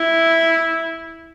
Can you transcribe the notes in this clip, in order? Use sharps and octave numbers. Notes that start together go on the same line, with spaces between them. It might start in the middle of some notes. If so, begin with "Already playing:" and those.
Already playing: E4